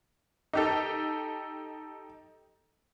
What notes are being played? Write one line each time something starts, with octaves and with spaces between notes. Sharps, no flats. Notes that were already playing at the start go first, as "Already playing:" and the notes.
D#4 G4 A4